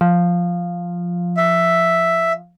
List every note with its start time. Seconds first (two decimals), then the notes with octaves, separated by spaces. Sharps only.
0.01 F3
1.37 E5